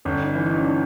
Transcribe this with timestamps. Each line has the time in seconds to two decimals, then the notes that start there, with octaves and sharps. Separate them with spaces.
0.05 G1 C#4
0.20 D#4
0.35 E3 D#4
0.50 D#4
0.58 C#4
0.64 D4